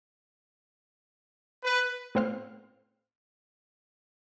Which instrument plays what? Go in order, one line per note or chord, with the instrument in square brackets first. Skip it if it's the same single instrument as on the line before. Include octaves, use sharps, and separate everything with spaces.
[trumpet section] B4
[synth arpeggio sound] A2 B3 C4 C5 F5 F6